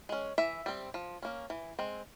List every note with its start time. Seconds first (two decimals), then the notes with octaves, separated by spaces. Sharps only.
0.09 G#3 C#4
0.38 E3 E5
0.66 G3 C4
0.94 F3
1.22 A#3 C#4
1.50 E3
1.79 G#3 C4